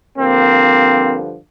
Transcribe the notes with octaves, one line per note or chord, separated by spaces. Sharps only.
G2 D3 F3 A#3 C4